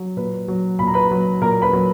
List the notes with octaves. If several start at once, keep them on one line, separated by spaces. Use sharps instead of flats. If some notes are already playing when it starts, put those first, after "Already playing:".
Already playing: F#3
A#2 B4
F#3
A#2 B5
A#5
B4 B5
F#3
A#2 A#4 A#5
B4 B5
F#3